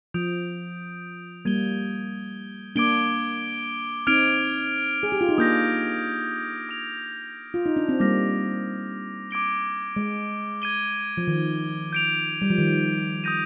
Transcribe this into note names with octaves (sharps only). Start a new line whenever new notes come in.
F3 D#6 G6 D7 F7
G3 A#3 G#6 D#7 G7
A#3 D4 D6 G#6 D7 G7
C4 D#4 F6 G#6 D7 F7
G#4
G4
F4
D#4
A#3 D4 D#6 G6 A#6
D#6 G#6 D7 F7
F4
D#4
D4
C4
G3 A#3 D6 F6 A#6 F7
D6 G#6 D7 G7
G#3
G#6 D#7 G7
F3
D#3
G6 D7 F7
G3
F3
D#3
D#6 G6 A#6 D#7